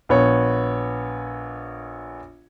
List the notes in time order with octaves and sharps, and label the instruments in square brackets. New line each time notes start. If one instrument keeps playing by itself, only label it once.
[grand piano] A#1 B3 C#5